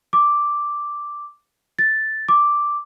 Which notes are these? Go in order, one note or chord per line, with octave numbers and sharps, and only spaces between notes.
D6
A6
D6